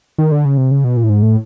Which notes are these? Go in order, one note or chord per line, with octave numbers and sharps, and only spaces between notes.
D#3
D3
C#3
C3
C#3
B2
A#2
A2
G#2
A2